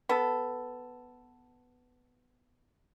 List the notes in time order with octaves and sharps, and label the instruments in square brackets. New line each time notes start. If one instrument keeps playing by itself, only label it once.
[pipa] B3 A4